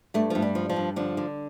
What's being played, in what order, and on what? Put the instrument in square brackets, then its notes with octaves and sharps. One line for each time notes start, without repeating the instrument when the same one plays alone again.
[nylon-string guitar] G2 A3
G2 F3
G3
F3
F3
G2
D3 F3
D3